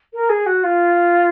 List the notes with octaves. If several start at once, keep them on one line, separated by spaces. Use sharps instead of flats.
A#4
G#4
F#4
F4